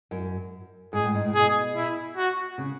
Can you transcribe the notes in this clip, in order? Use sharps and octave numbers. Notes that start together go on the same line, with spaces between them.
F#2
G#2 G#4
A2
G#2
A2
B2 G#4
E4
F#4
C#3